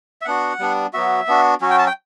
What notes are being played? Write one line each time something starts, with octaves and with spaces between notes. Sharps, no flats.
E5
B3 D4 F#4 F#5
G3 B3 D4
F#3 B3 F#4 E5
B3 D4 F#4
F#3 C#4 F#4
G5
A5
G5